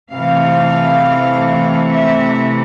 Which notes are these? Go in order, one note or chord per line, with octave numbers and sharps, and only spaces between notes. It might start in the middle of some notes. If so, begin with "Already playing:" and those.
C3 E3 A3 F5
E5